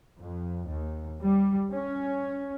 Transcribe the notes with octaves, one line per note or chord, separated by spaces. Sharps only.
F2
D#2
G3
C#4